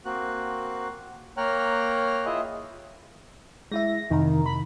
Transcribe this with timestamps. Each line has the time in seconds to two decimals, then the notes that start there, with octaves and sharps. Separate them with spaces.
0.05 A#3 C4 F#4 F#6
1.37 A#3 C#5 G5 A#5 F6 F#6
2.26 E4 F4 G#4 D#5 E5
3.72 G#3 E4 E5 A#6
4.11 F2 C3 D#3 A#5
4.46 B5